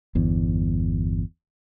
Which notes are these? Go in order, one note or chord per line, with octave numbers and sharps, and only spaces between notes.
G1 E2